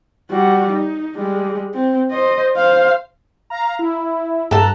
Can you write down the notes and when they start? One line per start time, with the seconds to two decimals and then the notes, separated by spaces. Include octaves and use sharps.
0.31 G3 F#4
0.72 D#4
1.16 G3 G#3
1.75 C4
2.11 C5 D#5
2.56 C5 F5
3.50 F5 A#5
3.79 E4
4.51 G2 A4 A5 A#5 F#6